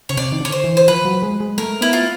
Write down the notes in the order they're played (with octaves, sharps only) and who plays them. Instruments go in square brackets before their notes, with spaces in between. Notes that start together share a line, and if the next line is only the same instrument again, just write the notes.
[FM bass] C#3 [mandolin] C#5
[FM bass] C3 [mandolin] D5
[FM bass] D#3
[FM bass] D3 [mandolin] C#5
[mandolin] C5
[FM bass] E3
[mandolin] C5
[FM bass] F3 [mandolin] B4
[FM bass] F#3
G#3
G#3
[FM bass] A3 [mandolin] A#4
[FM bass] B3 [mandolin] E4
[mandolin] F4